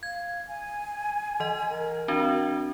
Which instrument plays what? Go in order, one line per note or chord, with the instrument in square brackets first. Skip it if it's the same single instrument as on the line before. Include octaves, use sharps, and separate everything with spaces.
[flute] F5 [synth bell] G#6
[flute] G#5
[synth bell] E3 D#5
[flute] A#4
[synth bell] C4 D4 F#4